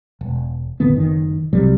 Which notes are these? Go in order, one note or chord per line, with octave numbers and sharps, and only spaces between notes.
E1
E1 A1 D3 B3
F#1 D#3
C2 C3 F#3 G3